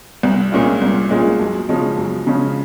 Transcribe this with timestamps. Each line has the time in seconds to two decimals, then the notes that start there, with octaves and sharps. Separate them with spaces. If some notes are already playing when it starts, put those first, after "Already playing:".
0.23 C2
0.52 A#2 G#3 C#4 F4
0.82 C2
1.10 A#2 G#3 C#4 F4
1.40 F#2
1.69 C#3 F3 G#3 C#4
1.98 F#2
2.27 C#3 F3 G#3 C#4